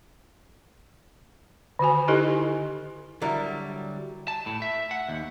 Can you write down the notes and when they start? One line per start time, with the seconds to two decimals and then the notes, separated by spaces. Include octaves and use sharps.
1.79 D3 D#3 F#4 G#5
2.08 D#4 E4 G4 A4 D#5
3.22 D3 F#3 G3 E4 A#4
4.28 A5
4.46 A2
4.62 E5
4.91 F#5
5.09 D#2